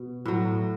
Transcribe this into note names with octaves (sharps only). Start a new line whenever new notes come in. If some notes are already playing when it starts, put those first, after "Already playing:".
Already playing: B2
A2 F#3